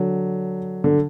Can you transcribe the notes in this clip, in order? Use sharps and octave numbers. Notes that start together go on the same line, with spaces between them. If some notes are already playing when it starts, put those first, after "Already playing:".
Already playing: D3 F#3
D3